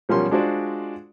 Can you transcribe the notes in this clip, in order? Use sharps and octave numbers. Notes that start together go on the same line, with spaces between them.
B1 F3 G3 C#4 A#4 C6
G#3 D4 F4 F#4 C5 D5